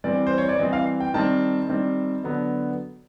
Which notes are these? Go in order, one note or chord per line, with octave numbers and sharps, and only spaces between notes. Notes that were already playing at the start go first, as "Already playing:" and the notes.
E3 G3 C4 D5
C5
C#5
D5
E3 G3 C4 D#5
F5
G5
D#3 G3 C4 A5
D#3 G3 C4
D3 F#3 B3